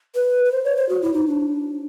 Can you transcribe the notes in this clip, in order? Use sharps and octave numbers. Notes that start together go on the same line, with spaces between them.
B4
B4
C5
C#5
C5
F#4
E4
D#4
D4